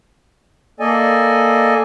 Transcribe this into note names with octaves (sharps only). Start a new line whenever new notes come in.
A#3 A4 D5 D#5 G#5